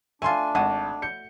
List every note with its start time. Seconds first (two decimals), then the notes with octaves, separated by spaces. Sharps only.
0.22 A3 D4 F4 G#5 C6
0.55 G#1 F#4 A5 D#7
1.02 G6 C#7